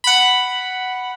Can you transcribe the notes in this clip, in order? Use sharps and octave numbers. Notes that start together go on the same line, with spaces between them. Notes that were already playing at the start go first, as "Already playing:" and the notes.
F#5 B5